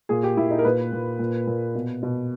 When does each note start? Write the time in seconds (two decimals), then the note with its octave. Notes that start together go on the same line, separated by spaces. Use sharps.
0.09 A#2 G#4
0.23 G4
0.37 A#2 E4
0.51 D#4
0.59 A#4
0.65 A#2 B4
0.92 A#2
1.19 A#2
1.47 A#2
1.75 B2
2.03 B2